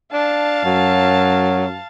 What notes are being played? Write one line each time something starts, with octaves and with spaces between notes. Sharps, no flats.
D4 F5 A5
F#2 F#3